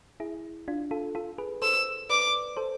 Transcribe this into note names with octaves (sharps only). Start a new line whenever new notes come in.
E4 G#4
D4 F4
F4 A4
F4 A4
G#4 B4
A4 C5 E6
B4 D5 D6
A4 C5